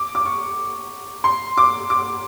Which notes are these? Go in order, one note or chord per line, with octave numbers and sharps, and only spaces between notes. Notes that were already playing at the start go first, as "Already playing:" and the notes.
Already playing: D6
D6
C#6
C6
D6
D6